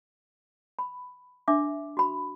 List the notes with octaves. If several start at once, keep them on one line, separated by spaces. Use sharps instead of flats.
B5
D4 E5 D6
F#4 B5